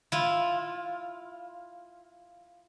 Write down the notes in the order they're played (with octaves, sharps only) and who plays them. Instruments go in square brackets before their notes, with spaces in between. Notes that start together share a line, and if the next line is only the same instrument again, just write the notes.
[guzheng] E4 F4